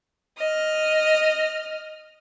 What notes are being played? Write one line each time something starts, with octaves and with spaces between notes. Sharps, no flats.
D#5 F6